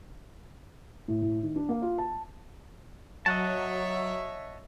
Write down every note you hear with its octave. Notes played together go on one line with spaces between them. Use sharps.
A2
A2
D#3
D4
A#3
F4
A5
F#3 C#5 D#5 E5 F#5 A5